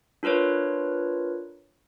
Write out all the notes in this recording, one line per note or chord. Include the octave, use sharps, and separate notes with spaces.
D4 F4 A#4 B4 C#5